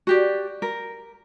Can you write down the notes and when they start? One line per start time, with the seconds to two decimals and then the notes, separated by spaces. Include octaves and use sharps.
0.07 F#4 G4 D5
0.62 A#4